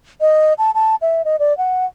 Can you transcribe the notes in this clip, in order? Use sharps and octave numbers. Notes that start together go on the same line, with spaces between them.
D#5
A5
A5
E5
D#5
D5
F#5